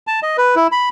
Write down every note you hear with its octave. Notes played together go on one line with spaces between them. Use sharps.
A5
D#5
B4
E4
B5